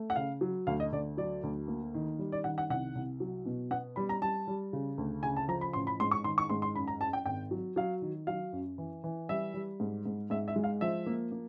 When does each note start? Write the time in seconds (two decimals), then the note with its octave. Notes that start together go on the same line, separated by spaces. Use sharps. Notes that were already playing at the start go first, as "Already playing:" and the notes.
Already playing: A3
0.10 F#5
0.16 C#3 F5
0.41 F#3
0.67 D2 F5
0.80 D#5
0.92 D2 D5
1.17 F#3 D5
1.43 D2
1.68 A#3
1.94 D#3
2.19 G3
2.32 D5
2.44 D#3 F#5
2.58 F#5
2.70 C2 F#5
2.95 C2
3.20 F#3
3.45 B2
3.71 B3 F#5
3.96 G3 B5
4.09 A#5
4.21 G3 A5
4.47 G3
4.73 C#3
4.98 D2
5.23 C#3 G#5
5.36 A5
5.48 F3 A#5
5.61 B5
5.73 A1 C6
5.87 B5
6.00 G#2 C6
6.11 C#6
6.24 D#3 C6
6.38 C#6
6.49 G#2 C6
6.62 C6
6.76 F#2 B5
6.88 A#5
7.01 F#2 A5
7.13 G5
7.26 G#1 G5
7.51 F#3
7.76 F#3 F5
8.02 D#3
8.27 F#3 F5
8.53 F#2
8.78 E3
9.04 E3
9.29 G3 E5
9.54 G3
9.80 G#2
10.05 G#2
10.30 G#2 E5
10.48 E5
10.56 G#3
10.64 F5
10.81 F3 E5
11.06 A#3
11.31 A#3